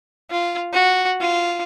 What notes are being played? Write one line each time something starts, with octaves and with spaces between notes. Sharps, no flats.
F4
F#4
F4